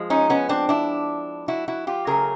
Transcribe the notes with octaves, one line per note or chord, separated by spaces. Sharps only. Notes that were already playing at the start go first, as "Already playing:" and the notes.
Already playing: F3 G#3
C#4 D#4
B3 C#4
C4 D4
D4 E4
E4 F#4
E4 F#4
F4 G4
C#3 F#3 A3 G#4 A#4